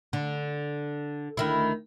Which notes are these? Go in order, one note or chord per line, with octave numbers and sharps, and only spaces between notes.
D3
D2 D#3 E4